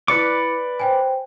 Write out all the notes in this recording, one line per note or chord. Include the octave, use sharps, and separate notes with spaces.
E4 B4 D5 D6 C#7
C5 G5 G#5